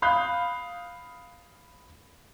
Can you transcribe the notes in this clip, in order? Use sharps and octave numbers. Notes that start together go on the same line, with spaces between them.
F5 B5 D#6 F#6 G6